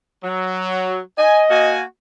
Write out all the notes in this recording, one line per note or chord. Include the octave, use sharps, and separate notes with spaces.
F#3
D#5 G#5
A#3 F#4 G#5